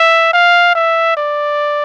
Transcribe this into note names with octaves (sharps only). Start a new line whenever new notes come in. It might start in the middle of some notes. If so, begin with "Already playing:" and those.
Already playing: E5
F5
E5
D5